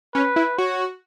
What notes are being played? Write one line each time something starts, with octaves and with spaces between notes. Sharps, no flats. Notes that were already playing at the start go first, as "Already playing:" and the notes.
C#4 B4
E4
F#4 C#5